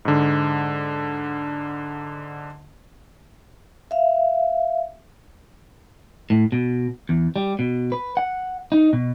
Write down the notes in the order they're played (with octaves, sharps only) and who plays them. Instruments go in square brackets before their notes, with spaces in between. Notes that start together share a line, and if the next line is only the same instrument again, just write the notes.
[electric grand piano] G#2 D3
[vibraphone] E5 F5
[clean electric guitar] A2
B2
E2
G3
B2
B4
F#5
D#4
B2